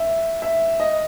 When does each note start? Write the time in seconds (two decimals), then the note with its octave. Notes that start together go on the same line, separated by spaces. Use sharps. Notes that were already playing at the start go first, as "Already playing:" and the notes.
Already playing: E5
0.42 E5
0.80 D#5